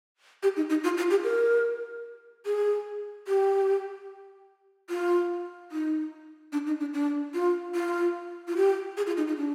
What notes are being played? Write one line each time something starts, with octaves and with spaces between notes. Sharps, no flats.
G4
D#4
D#4
F4
F4
G4
A#4
G#4
G4
F4
D#4
D4
D#4
D4
D4
F4
F4
F4
G4
G#4
F4
D#4
D#4
D4